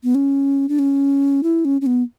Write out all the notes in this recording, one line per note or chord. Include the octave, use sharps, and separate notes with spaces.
B3
C#4
D4
C#4
E4
C#4
C#4
B3